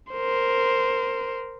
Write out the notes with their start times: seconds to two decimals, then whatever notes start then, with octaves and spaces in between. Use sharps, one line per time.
0.12 A#4 C5